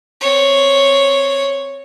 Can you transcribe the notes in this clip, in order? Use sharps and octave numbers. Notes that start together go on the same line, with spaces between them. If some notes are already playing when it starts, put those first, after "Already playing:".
C4 C#5